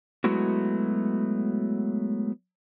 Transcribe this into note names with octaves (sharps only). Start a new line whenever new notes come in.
F#3 G#3 A3 B3 E4 F#4